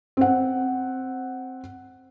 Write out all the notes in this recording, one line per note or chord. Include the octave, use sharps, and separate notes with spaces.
C4 F#5